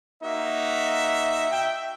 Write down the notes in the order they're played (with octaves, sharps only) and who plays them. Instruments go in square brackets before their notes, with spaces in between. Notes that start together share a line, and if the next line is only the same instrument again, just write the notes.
[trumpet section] A#3 D#4 F#4 [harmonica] E5
[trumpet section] G5